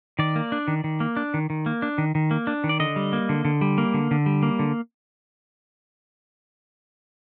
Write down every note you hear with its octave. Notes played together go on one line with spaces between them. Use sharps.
D#3 D5
A#3
D4
D#3
D#3
A#3
D4
D#3
D#3
A#3
D4
D#3
D#3
A#3
D4
D#3
D5
D3 D#5
G3
A#3
D3
D3
G3
A#3
D3
D3
G3
A#3
D3